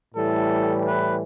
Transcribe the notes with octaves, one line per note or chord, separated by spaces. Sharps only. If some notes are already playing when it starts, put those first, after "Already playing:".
A2 E3 G3 A4
B4